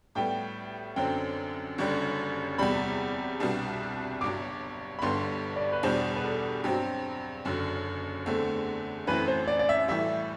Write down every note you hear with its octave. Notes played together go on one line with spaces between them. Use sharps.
A2 G3 B3 G5
F#2 D3 F#3 C4 G5
F#1 F#2 D3 G3
E2 C3 G3 B5
C2 B2 G3 B3 D4
G1 G2 F#3 D6
B5
G1 G2 D3 G3 B3 C6
D5
B4
E2 B2 G3 D4 C5
B4
A4
G2 F#3 C4 G4
F#1 F#2 D3
E2 D3 A3 C4
F#2 E3 A3 C4 B4
C5
D5
D5
E5
A2 E3 G3 E5